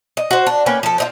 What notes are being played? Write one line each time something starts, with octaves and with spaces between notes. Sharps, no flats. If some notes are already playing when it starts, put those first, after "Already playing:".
D#5
F#4 C5
D4
A#3 C#4 B4 G5
F3 A4
C4 D#4 F4